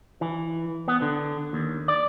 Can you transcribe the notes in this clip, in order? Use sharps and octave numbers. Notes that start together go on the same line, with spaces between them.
E3
B3
D3
D#2
D5